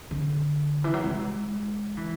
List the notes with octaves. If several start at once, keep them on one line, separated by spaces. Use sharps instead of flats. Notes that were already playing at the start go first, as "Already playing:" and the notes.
D3
E3
F#3
G#3
E3